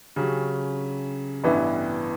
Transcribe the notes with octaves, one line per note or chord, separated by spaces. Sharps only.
C#3 F#3 C#4 G4
A1 G2 E3 B3 E4